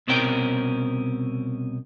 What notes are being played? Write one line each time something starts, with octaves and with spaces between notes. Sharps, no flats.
C2 B2 C4 C#4 A#4 G5